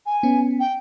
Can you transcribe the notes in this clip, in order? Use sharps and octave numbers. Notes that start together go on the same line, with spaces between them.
G#5
B3 C#4
G5